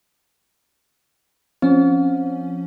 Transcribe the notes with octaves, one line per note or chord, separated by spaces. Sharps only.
F3 C4 C#4